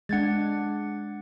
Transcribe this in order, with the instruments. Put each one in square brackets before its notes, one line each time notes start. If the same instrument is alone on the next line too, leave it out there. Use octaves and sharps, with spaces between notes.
[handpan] G#3 D4 [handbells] F#5 G#6 A6